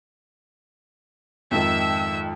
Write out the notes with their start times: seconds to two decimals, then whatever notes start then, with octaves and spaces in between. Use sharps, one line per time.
1.51 F2 G#2 D#3 E5 E6